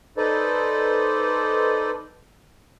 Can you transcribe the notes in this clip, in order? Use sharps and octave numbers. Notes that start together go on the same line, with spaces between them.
D#4 A4 B4 C5 D5 D#5